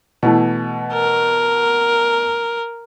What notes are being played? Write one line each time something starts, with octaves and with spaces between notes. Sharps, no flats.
B2 E3 A3
A#4